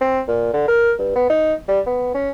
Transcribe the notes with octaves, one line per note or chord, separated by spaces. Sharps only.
C4
A#2
D3
A#4
G2
B3
D#4
G3
B3
C#4